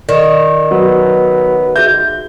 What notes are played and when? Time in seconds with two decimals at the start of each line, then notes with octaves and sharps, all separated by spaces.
0.09 D#3 D5
0.71 F#3 B3
1.76 F#4 G#4 E5 G6